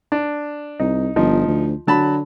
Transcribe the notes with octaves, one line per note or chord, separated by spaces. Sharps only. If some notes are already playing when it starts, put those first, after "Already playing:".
D4
C2 D#4
G1 F3 D#4
D2
D3 F#3 A5 B5